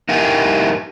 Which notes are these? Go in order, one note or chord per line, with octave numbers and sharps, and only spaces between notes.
D#4 E4 G4 A#4 G5 G#5